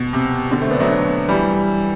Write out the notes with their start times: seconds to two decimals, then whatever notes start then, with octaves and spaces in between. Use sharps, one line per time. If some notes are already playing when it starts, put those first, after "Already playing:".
Already playing: B2
0.13 C3
0.51 B2 D3
0.62 A3 C4
0.71 B3 D4
0.80 F#3 A3
1.28 E3 G3